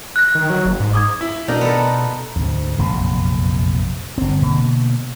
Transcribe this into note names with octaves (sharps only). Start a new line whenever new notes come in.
F#6 A#6
D#3
F#3
F#1
G#2
D6 D#6 G#6
E4
B2 D4 D#4 A#4
B3 F4 A4
D2 G#2
F1 A#1 F#2 C3
G1 C4
B2 D3 A#3